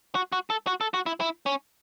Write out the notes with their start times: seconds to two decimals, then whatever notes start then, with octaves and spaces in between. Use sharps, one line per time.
0.15 F#4
0.32 F#4
0.50 A4
0.67 F#4
0.81 A4
0.94 F#4
1.06 E4
1.20 E4
1.46 C#4